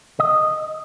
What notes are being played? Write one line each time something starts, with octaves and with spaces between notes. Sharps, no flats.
D#5